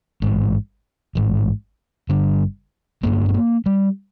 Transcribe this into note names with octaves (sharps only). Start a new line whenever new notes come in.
A1 G#2
A1 G#2
G1 G2 D3
G1 G2 D3 A#3
B3
A#3
G3